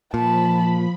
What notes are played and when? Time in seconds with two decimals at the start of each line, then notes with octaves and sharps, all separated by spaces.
0.14 A#2 F3 A5 B5